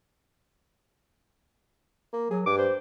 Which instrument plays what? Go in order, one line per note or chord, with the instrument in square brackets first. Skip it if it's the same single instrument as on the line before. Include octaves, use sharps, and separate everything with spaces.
[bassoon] A#3
[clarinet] F#3 [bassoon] G#4
[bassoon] G2 [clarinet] D6
[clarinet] C5